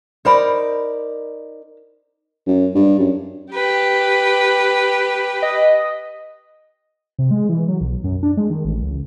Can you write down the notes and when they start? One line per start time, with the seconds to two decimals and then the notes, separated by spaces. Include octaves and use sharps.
0.25 D#4 A#4 C5 D5 B5
2.47 F#2
2.75 G2
2.99 F#2
3.52 G4 B4 G5
5.42 D#5
7.19 C3
7.31 G#3
7.49 E3
7.68 F#3
7.81 B1
8.04 F#2
8.23 D4
8.37 G#3
8.50 D#3
8.64 A1
8.82 C#2